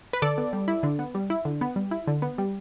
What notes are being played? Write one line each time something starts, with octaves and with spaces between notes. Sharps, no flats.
B4
D3 A4 D5
B3
G3
E4
D3
B3
G3
E4
D3
B3
G3
E4
D3
B3
G3